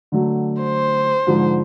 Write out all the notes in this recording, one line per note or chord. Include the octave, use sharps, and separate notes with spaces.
D3 F#3 A3
C5
G#2 D3 F3